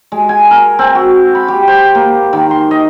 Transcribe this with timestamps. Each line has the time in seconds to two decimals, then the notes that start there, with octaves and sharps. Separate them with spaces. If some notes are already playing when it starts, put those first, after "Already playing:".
0.12 G#3
0.29 G#5
0.51 A#4
0.79 C4
0.95 F#4
1.35 B5
1.48 G4
1.67 C5
1.95 A#3
2.33 D#3
2.51 C6
2.71 D#5